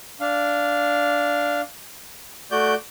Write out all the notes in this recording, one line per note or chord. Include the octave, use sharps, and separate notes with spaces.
D4 F5
A3 F#4 D5 G6